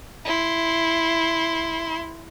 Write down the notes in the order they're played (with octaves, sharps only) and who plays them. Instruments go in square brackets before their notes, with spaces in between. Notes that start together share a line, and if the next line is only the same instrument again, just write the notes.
[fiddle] E4 C6